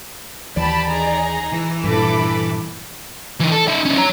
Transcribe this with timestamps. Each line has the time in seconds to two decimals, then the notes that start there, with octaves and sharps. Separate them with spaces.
0.57 D#2 E3 G4 D5 A5 B5
0.90 D#4 G#4 A#5
1.52 E3
1.84 G2 A#2 A4 B5 D6
2.22 E3
3.40 E3 D#4
3.52 A4
3.68 D#4 E5
3.85 C#4 D#4
3.97 C#5 A#5